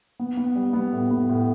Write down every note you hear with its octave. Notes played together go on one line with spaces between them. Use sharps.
B3
B3
G3
B3
A2
B3
A2